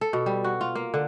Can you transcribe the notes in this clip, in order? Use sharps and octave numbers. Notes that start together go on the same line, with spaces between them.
A4
B2
G3
F#4
F4
A#3
D3